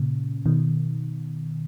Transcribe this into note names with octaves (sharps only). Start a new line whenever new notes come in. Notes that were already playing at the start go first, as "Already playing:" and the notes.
Already playing: A#2 C#3
B2 D#3